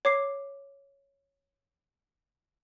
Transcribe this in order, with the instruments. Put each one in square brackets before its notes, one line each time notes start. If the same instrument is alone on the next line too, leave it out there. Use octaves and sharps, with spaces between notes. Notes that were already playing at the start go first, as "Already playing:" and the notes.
[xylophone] C#5 D6 C7